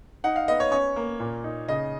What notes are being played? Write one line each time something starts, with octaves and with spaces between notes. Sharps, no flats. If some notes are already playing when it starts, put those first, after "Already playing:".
D#4 F#5
F5
B3 D#5
C#5
C#4 C#5
A#3
A#2
D#4
C#3 D#5